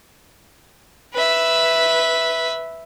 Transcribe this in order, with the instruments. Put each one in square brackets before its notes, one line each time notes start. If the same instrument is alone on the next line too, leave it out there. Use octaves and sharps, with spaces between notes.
[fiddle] B4 E5